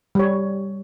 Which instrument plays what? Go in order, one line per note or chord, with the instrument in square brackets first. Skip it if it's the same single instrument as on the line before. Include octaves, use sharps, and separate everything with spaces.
[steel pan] G3 C#5